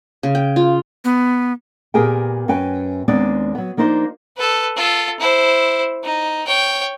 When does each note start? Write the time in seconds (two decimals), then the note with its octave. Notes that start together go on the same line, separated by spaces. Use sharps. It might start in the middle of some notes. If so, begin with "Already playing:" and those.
0.23 C#3
0.35 G5
0.56 F4
1.05 B3
1.94 A#2 B3 G4 G#4 A#4 G5
2.48 F#2 C#4 B4 G5 G#5
3.08 D#2 G#3 B3 C4 D4 D5
3.55 F#3 B3
3.77 F3 A#3 D4 D#4 C5
4.37 A4 B4
4.77 F4 A4
5.20 E4 C5
6.04 D#4
6.47 C#5 G5